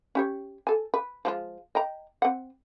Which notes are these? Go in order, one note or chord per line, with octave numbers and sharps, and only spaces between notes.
C#4 G4 C#5
A4 G#5
B4
F3 G#3 F4
D#5 G5 A#5
C4 F#5